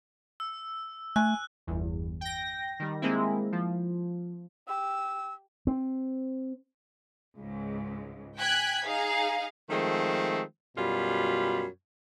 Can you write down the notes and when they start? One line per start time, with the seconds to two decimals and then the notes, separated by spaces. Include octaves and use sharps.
0.40 E6
1.16 A3 G#5 F#6
1.67 G1 E2
2.21 G5 A#6
2.79 D#3 G3
3.02 G#3 A#3 C4 E4
3.52 F3
4.68 G4 E6
5.67 C4
7.38 C#2 G#2
8.38 G5 G#5 F#6 G#6 B6
8.85 D#4 G#4 F5
9.70 D#3 F3 G#3 A3 C4
10.77 F#2 B2 G3 F4 B5